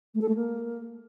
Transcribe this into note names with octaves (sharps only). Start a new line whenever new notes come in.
A3
A4
A3
A#3